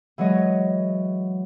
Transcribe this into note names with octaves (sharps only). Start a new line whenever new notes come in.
E3 F#3 G#3 C#5 D#5 C#6